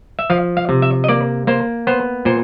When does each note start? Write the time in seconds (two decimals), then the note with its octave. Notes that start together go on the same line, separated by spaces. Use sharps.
0.19 E5
0.30 F3 F5
0.57 F5
0.69 C3
0.82 E5
1.04 D#5
1.09 A#3 D5
1.47 A#3 C5
1.87 B3 C5
2.25 A#2 C5